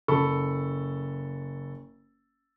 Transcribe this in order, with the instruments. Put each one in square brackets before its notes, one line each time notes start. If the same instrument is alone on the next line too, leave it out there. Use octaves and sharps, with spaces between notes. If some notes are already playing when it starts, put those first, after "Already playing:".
[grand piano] F#1 A4 B5 C#6